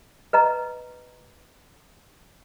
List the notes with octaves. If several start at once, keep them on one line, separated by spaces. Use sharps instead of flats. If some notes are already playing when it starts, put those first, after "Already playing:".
B4 D#5 A#5